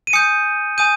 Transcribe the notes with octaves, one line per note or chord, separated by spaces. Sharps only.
D#7
G#5 D#6 G6 C#7
G#5 D#6 G6 D#7